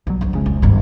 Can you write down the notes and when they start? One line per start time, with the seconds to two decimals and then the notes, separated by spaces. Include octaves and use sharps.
0.07 B1 F#3 G3
0.21 D2 D3
0.33 F1 C#3 G#3 C4
0.46 C2
0.62 G1 D2 G#2 D#3 G3